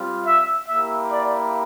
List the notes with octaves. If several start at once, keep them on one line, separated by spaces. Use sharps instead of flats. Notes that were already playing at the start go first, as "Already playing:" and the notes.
Already playing: G3 C4 F4
E5
A#3 E4 G4 E5
D5